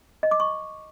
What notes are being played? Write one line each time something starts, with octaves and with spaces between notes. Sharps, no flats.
D#5
D6
C#6